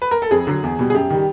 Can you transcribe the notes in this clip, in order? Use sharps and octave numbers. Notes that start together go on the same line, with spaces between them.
B4
A#4
A4
F2 G#4
D3 F#3
E2
B2 G3
G#4
F#2 G4
D#3 G3